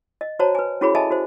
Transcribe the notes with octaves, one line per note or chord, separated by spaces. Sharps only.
D#5
F#4 C5 C#5 A5 A#5
B4 G#5
C#4 E4 F#4 G#4 C#5 B5
A4 D#5 E5 G#5 A5
F#4 C5